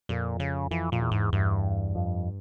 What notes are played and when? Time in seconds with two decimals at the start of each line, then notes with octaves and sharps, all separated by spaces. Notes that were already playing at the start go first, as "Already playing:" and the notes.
0.09 F2 A#2
0.40 C#3
0.71 F2 E3
0.92 F2 A#2
1.02 E2
1.12 G#2
1.33 E2 G2
1.95 F2